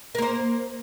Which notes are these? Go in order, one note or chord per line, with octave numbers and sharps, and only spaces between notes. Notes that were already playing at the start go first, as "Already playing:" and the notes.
A#3 A#4 C5